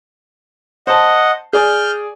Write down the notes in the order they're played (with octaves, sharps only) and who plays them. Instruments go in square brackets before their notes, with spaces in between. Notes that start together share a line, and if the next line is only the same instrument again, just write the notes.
[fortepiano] C5 A5 [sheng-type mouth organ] D#5 F#5
[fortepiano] G#4 D5 [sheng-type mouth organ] F6 G6